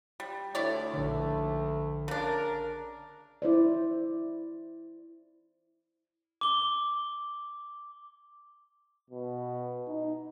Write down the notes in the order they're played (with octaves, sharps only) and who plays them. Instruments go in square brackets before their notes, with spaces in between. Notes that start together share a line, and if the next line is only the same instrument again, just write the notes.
[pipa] G3
[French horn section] D2 A3 [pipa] E4 C#5 D5
[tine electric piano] A#1 D3
[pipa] C#3 D4 [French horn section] A#4
[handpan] E4 C5 D5
[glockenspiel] D6 G7
[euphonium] B2
D#4